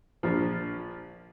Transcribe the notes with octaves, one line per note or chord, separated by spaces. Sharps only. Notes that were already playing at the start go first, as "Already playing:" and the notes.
A#1 F3